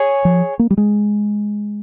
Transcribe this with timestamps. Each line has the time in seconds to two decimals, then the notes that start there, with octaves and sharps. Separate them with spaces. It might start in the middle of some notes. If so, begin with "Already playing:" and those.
Already playing: G#4 C#5 G#5
0.25 F3
0.59 A#3
0.70 G3
0.77 G#3